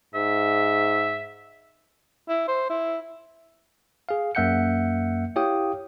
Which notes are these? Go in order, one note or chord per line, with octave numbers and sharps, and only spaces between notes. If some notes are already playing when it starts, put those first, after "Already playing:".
G#2 E5
E4
C5
E4
G#4 F5
F#2 A#3 E5 F#5 G6 C#7
E4 G4 C#5 F5 G5 D#6